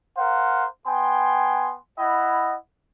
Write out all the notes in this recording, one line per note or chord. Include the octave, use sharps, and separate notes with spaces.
A#4 C5 F5 F#5
B3 G5 G#5 C6
E4 D#5 F#5 B5